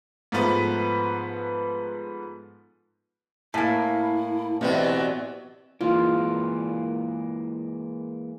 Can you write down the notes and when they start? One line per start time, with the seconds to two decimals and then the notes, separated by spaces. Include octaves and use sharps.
0.32 G#2 F3 A3 B3 B4
3.54 A2 A#3 E4 G#5 A5
4.61 B2 E3 F#3 B3 C4 G4 D5
5.81 E3 G#3 A#3 F4